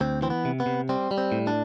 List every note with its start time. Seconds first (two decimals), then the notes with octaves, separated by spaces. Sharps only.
0.01 D2 C4
0.22 E3 C4
0.30 B3
0.45 C3
0.60 B3
0.66 C3
0.89 G3 C4
1.11 G3
1.18 C4
1.32 A2
1.47 D4